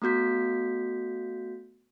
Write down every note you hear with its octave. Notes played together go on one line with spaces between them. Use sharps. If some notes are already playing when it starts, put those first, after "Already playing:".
A3 B3 F#4 G6 B6